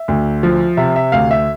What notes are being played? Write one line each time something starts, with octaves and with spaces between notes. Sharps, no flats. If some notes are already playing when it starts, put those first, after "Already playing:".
Already playing: E5
D2
F3
C3 E5
E5
D2 F5
E5